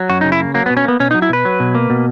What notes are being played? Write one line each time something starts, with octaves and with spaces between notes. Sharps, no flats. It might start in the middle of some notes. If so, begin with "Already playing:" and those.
Already playing: F#3
F#2 F#4
D#4
C#3
E4
A#3
F#3 A#3
B3
B2
C#4
A#3 B3
B2 C#4
D#4
F#3
E4
B2 B4
F#3
B2
A#3
B2